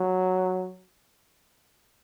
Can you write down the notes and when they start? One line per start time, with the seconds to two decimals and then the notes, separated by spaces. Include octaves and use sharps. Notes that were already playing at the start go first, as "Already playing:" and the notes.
Already playing: F#3